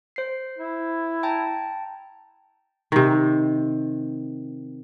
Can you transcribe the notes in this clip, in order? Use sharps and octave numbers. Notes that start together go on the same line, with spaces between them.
C5 C7
E4
G5 A5 A#5
C3 D#3